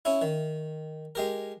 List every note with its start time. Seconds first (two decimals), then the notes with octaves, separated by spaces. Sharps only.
0.05 C#4 E4
0.22 D#3
1.15 G#3 G4 A#4